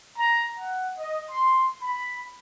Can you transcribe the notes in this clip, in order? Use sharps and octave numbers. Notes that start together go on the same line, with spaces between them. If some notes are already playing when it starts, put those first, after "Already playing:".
A#5
F#5
D#5
C6
B5